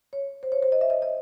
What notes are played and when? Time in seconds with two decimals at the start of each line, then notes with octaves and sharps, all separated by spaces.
0.13 C#5
0.43 C5
0.52 C#5
0.62 C5
0.72 D#5
0.81 E5
0.90 D#5
1.02 D#5